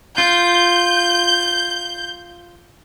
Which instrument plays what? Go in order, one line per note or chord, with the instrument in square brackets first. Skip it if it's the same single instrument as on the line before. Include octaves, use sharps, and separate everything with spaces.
[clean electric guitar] F4 [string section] G6